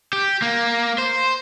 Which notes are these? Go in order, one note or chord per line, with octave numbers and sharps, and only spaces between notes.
G4
A#3
C5